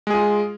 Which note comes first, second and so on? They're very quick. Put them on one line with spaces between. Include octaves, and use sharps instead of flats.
G#3 G#4 F4